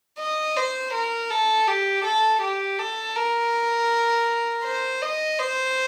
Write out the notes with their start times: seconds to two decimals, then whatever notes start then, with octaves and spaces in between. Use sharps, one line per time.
0.19 D#5
0.57 C5
0.93 A#4
1.31 A4
1.68 G4
2.05 A4
2.42 G4
2.79 A4
3.16 A#4
4.64 C5
5.02 D#5
5.39 C5